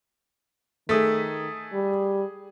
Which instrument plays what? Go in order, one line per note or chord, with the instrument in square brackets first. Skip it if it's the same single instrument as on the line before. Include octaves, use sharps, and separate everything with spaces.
[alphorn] D#3 [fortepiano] A3 [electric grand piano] G#4 D#6 B6
[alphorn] G3